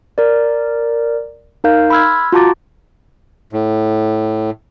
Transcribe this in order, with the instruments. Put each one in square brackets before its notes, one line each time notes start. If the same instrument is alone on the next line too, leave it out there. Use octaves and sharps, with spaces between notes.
[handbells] A#4 D5
D#4 A#4 F5 G6
B5 C6 E6 F6 G#6
F4 F#4 A5 A#5 D6 A6
[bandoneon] A2